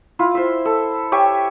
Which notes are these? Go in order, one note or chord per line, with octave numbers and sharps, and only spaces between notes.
E4 F4
C5 E5
A4
G4 C#5 E5 G#5